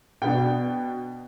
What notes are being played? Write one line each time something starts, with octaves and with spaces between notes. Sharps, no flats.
B2 B3 D4 G5